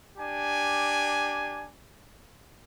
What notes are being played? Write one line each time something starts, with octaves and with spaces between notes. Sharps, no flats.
D4 G4 G#5